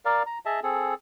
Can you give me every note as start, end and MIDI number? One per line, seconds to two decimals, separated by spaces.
0.05 0.23 70
0.05 0.23 74
0.05 0.23 77
0.26 0.38 82
0.45 0.60 68
0.45 0.60 75
0.45 0.60 76
0.45 0.60 81
0.63 0.94 60
0.63 0.94 68
0.63 0.94 69